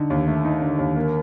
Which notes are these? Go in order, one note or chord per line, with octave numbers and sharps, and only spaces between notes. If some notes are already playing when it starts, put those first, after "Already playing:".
Already playing: D3 D#4
D#2
A3
D#4
D3
D#2
A#3